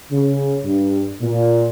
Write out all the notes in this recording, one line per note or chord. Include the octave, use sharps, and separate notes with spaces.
C#3
G2
A#2